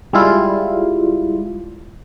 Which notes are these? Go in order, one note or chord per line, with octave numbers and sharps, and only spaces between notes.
G3 G#3 E4 F4